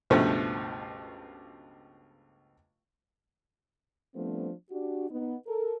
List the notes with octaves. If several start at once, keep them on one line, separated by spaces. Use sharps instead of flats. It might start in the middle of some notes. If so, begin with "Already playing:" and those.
C#2 G2 B2 F3 A3
F3 G3 A3 B3 C4 D4
D4 F#4 G4
B3 D#4
A4 A#4